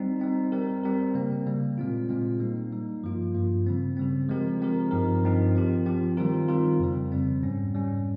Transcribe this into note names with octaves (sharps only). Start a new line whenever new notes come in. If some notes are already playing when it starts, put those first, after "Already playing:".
Already playing: G3 C4 D#4
G3 C4 D#4
G3 C4 G4 A#4
G3 C4 G4 A#4
C#3 G3 A#3
C#3 G3 A#3
A#2 G#3 C4 F4
A#2 G#3 C4 F4
G3 A#3 D#4
G3 A#3 D#4
G2 F3 A#3 F4
G2 F3 A#3 F4
C#3 G3 C4
C#3 G3 C4
F3 G#3 C4 G4 A#4
F3 G#3 C4 G4 A#4
G2 F3 C4 D#4 A#4
G2 F3 C4 D#4 A#4
F3 C4 G4
F3 C4 G4
D#3 G3 C4 F4 A#4
D#3 G3 C4 F4 A#4
F2 C#3 G3 C4
F2 C#3 G3 C4
G#2 G3 C#4
G#2 G3 C#4